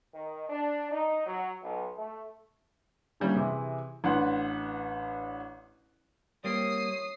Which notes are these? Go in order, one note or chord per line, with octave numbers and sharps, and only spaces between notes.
D#3
D4
D#4
F#3
B1
A3
D3 E3 G3 A#3 C#4
C3 E3 G#4
A1 D4 B4 F#5 C6
G3 A#3 C4 C#5 D#6 C7